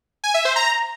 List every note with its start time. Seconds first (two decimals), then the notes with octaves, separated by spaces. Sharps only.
0.24 G#5
0.34 E5
0.45 C5
0.56 A#5